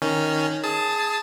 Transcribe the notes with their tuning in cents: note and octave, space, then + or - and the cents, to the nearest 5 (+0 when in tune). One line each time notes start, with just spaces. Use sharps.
D#3 +0 C#4 +0
G#4 +0 A5 +0 D#6 +40